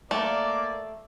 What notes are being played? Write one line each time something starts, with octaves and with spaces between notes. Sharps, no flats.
A3 A#3 D5